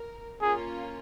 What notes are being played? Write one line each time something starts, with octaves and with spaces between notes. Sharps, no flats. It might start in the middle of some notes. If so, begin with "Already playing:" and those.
Already playing: A#4
A#3 C#4 F4 G#4